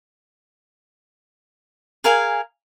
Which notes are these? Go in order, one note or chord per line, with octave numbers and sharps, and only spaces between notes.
G#4 A#4 F5 G#5